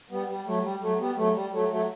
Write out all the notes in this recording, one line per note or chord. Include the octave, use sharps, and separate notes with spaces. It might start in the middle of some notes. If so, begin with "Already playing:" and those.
G3 B3
G3
F#3 A3
G3
F#3 A3
G3 B3
F#3 A3
G3
F#3 A3
F#3 A3